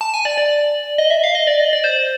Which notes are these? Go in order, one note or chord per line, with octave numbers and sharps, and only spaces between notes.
A5
G#5
D5
D5
D#5
E5
F5
D#5
D5
D#5
D5
C5